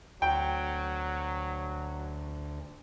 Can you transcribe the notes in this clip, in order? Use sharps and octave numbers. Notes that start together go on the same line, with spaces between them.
D2 F#3 G5